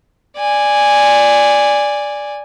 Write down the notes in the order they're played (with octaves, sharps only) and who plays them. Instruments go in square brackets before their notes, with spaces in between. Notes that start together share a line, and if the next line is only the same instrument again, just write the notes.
[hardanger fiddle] D5 G#5